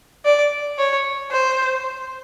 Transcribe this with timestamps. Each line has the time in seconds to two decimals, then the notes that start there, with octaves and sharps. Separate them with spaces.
0.25 D5
0.79 C#5
1.32 C5